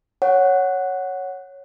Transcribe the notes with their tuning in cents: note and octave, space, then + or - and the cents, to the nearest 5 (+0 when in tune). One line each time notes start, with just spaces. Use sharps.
C#5 +0 F#5 +0